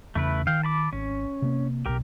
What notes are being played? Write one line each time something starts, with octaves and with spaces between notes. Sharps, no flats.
E2 C#3 A3 C#4 E4 B4
D#3 F5 G5
A5 B5 D6
G#1 C#4
C3 A#3
B1 B2 G4 A#4